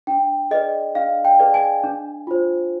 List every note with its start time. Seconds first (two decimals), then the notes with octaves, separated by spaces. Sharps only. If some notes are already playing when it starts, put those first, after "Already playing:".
0.07 D4 G5
0.51 G#4 B4 D5 D#5
0.95 D4 F5
1.25 G5
1.39 G#4 B4 D5
1.54 G#5
1.83 D4
2.27 F4 C5